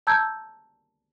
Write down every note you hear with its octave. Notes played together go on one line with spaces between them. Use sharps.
A5 A#5 E6 G6 G#6